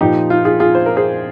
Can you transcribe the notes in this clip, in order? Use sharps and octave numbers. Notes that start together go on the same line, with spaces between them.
A#2 F3 D#4 G4
F4
F4 G#4
F4 G#4
C5
A#4
G#4 C5